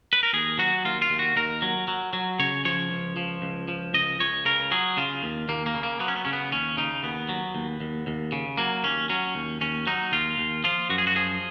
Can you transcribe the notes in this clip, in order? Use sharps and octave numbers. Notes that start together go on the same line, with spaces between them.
B4
A#4
D#2 G#4
F#3 F#4
D#2 F4
F4
D#2
F#4
D#2 A#4
F#3
F#3
F#3
C#3 C#5
F3 C#5
C#2
F3
C#2
F3
C#2 D#5
C#2 C#5
C#3 A#4
F#3 G#4
C#3 F4
D#2
D#2 A#3
A#3
C#3
A#3
F#3 B3
C#4
B3
C#3 C#4
B3
D#2 C#4
C#3 D#4
D#2 B3
F#3
D#2
D#2
D#2
C#3
F#3 A#3
D#2 C#4
F#3 C#4
D#2
D#2 C#4
F#3 D#4
D#2 F4
D#2
F3 F4
F#2 F#4
G#4
F#4
F3 G#4